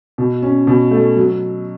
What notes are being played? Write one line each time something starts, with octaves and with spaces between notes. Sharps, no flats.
B2
C#4
B2
A3
F#3